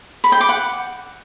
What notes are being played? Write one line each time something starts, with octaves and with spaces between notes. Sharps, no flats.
B5
G5
D6
F#5